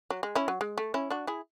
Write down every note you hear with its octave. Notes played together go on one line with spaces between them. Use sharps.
F#3
G#3
C#4 E4
F#3
G#3
A3
C#4 E4
D4 F#4
E4 G#4